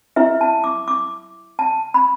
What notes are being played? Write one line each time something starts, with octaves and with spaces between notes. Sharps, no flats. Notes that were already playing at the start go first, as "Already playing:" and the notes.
E4 B4 E5
A5
D6
D6
A5
B5